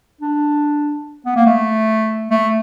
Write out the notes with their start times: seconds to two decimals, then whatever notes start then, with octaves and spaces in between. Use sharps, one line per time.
0.21 D4
1.26 B3
1.36 A#3
1.46 A3
2.30 A3